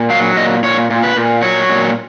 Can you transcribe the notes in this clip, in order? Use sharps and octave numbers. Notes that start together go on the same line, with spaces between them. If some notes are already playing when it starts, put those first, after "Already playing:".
Already playing: A#2
F#3 F5
A#2 D#5
A#2 C#5
A#2
B4
A#2
F#3 C#5
A#2